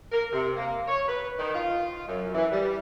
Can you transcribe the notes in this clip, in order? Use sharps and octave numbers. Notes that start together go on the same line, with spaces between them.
A#4
C3
A#3
C#5
B4
D#3
F4
F#2
E3
G3